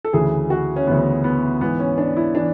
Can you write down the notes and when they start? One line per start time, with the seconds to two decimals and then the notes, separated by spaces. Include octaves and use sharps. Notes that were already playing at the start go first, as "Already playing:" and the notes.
0.05 A4
0.13 D2 C#3 E3 G#4
0.50 F#4
0.76 C#4
0.87 D2 C#3 E3 B3
1.24 B3
1.61 G#2 E3 B3
1.79 C#4
1.98 D4
2.17 E4
2.35 E3 D4